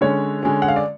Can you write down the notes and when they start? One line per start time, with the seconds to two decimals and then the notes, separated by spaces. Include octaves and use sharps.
0.01 D3 G#3 C#4 C#5
0.43 D3 G#3 C#4
0.62 F#5
0.68 F5
0.76 D5